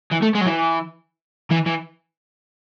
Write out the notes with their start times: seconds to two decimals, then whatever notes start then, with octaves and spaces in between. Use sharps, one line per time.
0.11 E3
0.22 A3
0.35 G#3
0.41 F#3
0.47 E3
1.50 E3
1.66 E3